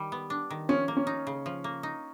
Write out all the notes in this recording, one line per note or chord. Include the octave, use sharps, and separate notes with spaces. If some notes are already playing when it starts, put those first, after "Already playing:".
Already playing: D#3 G3
B3
D4
D#3
F3 C#4
A#3
C#4
D#4
C#3
F3
A#3
D#4